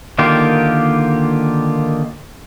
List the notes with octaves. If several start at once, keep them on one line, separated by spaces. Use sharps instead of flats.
D3 D#3 A#3 F4 G4